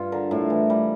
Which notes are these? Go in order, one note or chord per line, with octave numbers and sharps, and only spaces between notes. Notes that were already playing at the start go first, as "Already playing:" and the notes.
Already playing: G2 F4
D3 A#4
A2
E3
G3